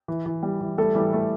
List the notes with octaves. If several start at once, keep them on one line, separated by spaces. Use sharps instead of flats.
E3
E3
G3
E3
G3 A3 A4
E3 G3 G4
A3 A4